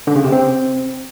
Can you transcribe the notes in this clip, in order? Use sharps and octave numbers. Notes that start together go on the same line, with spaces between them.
D3
C#3
C3
C4